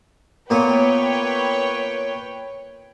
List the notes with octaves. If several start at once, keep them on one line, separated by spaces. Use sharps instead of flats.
A#2 A#3 B3 B4 C#5 G5